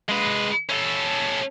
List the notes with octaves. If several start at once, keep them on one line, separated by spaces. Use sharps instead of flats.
G#3 B4
C#4 A4